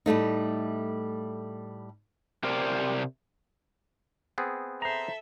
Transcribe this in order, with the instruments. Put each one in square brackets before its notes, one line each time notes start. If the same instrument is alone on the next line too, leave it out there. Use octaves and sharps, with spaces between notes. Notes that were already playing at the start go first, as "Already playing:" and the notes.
[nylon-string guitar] A2 G3 A3 D#4
[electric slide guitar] C3 G4 A#4 C5 D5
[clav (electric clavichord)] B3 C4 G#4
[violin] A4 E5 [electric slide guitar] C5 A#5